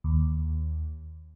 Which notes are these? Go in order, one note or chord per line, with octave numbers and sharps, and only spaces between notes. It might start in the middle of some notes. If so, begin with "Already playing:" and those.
D#2